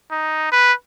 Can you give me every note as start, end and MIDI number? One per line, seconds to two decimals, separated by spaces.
0.11 0.49 63
0.52 0.73 71